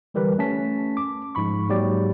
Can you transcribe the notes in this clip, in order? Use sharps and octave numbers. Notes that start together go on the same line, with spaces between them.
D3 E3 G3 G4 A#4 B4
A3 C#4 A5 B6
D6
G#2 F3 B5 C#6
G#2 F#3 A#3 G4 D5